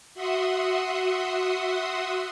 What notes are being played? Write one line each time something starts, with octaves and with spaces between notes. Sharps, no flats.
F#4 E5 F#5 C6 D#6